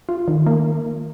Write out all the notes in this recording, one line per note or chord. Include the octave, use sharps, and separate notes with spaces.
F4
D#3
A#3